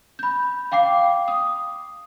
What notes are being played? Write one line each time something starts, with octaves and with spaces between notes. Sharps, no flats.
B5 G6
F5 G5 D6 C7
D#6